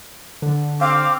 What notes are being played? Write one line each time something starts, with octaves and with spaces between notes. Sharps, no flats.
D3
C4 F5 D6